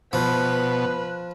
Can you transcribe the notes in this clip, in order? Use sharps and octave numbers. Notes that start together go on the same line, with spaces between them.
B2 F3 B4